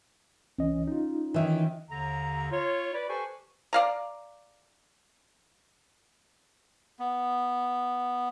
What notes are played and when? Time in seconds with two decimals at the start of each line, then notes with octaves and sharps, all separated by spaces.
0.59 C2 E3 C#4 D#5
0.87 D#4 F4
1.34 D#3 E3 C#5 E5
1.90 D#2 D3 A#5
2.51 F4 C#5
2.93 B4 D5
3.09 G4 A4 B4 C5 G#5 C#6
3.73 D5 F5 A#5
6.99 B3